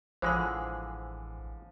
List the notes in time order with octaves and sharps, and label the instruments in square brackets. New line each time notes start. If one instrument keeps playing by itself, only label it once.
[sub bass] A1 [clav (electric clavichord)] D3 E3 G#3 [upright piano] F3 [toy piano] C5 F#5 C6